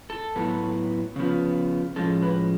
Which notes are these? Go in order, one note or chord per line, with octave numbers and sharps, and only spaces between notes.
A4
A2 F#3 B3
C#3 F3 B3
A2 F3 G#3 C#4 A4
B4